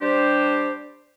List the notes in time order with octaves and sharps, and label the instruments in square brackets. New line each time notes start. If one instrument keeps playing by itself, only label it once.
[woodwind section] G3 D4 G4 C5